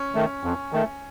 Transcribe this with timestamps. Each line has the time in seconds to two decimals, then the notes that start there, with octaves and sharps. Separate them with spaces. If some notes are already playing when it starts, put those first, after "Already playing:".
Already playing: C#4
0.15 D#3 A3
0.44 F2
0.72 D#3 A3